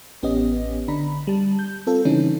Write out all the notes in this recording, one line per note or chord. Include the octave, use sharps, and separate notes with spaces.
A1 B3 C#4 G4 D#5
D3 D4 A#5 B5
G3 A5
G6
C4 F4 A4
C#3 E3 G3 C#4 D#4